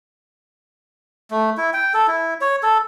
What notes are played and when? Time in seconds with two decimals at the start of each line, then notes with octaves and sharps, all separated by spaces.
1.31 A3
1.57 E4
1.73 G5
1.94 A4
2.07 E4
2.41 C#5
2.63 A4